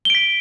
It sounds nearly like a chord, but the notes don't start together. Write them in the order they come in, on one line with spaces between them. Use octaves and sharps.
G7 D7 B6